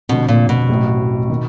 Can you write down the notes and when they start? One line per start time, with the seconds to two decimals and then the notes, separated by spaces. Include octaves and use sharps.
0.09 F1 F2 B2 D3
0.28 A#2
0.49 B2
0.69 A1 A2 F#3
1.30 D#3